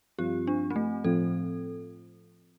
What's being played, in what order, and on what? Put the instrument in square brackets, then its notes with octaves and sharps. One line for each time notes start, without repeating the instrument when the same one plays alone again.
[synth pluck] G2 F3 C4 F4 [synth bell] G4
[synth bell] D4
C4
A3
[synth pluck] A2 F3 C4 F4 [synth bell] A4